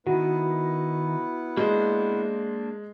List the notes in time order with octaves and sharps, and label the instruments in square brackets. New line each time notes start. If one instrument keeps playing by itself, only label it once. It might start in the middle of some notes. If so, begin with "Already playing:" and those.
[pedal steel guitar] D#3 [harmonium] B3 E4 B4 [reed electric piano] F#4
[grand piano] G#3 [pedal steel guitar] A#3 D4 C5